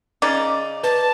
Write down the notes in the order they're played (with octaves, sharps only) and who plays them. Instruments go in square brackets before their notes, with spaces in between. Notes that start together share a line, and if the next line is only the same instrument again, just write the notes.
[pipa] C#3 D#4 [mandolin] D5
[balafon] B4 [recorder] A5